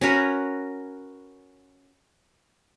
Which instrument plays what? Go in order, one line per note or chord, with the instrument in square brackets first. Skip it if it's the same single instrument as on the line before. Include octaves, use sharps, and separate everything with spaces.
[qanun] C#4 F#4 A#4 B4